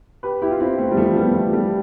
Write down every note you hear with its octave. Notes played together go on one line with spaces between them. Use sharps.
G4 B4
E4 G4
F4
C4 E4
A3 C4
G3
F3 A3
G3 B3
F3 A3
G3